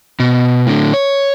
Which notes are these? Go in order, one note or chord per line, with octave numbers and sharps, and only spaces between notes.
B2
A2 D3
C#5